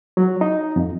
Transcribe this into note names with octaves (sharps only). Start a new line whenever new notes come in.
F#3
D#4
F2